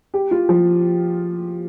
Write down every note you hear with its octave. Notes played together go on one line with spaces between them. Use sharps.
G4
F4
F3